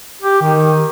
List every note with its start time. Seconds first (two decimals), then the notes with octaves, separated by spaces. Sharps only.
0.22 G4
0.42 D#3